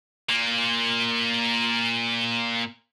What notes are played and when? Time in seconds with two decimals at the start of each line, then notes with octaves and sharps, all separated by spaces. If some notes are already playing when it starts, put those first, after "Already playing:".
0.30 A#2 A#3